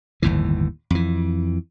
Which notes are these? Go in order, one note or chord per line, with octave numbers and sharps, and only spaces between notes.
G1 D#2 A2 E3
F2 E3